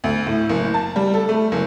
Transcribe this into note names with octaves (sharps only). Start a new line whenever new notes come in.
D2
A2
F#1
A5
G3
A4
A3
F#1